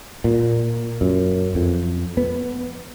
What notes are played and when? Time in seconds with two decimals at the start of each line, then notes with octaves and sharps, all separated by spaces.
0.24 A#2
1.01 F#2
1.55 F2
2.17 B3